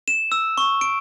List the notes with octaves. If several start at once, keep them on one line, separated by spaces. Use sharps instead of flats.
E7
E6
C#6
D7